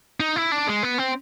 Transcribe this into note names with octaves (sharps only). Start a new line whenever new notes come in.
D#4
E4
D4
G#3
B3
C4